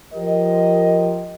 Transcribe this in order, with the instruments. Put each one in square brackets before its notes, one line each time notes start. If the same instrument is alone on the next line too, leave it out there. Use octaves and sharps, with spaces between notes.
[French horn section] F3 G4 A#4 D#5